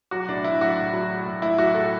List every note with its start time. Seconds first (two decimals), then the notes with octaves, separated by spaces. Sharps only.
0.11 F#3 F#4
0.28 A2 D4
0.44 A2 E4
0.61 F#3 F#4
0.78 A2
0.93 F#3
1.10 A2
1.26 A2
1.42 A2 E4
1.58 F#3 F#4
1.75 A2 A4